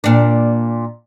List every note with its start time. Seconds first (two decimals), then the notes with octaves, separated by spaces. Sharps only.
0.04 A#2 D4